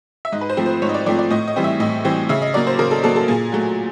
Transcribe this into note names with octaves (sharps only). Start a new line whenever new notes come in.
E5
G#2 D#5
B4
C5
F3 A3 C4
C5
G#2 C#5
D#5
D5
F3 A3 C4 D5
D5
A2 D#5
D#5
E3 G3 C4
E5
A2 D#5
E3 G3 C4
C#3 E5
D#5
F#3 A#3 D5
C5
C#3 A#4
A4
F#3 A#3 A4
A4
A#2 G#4
F#3 A3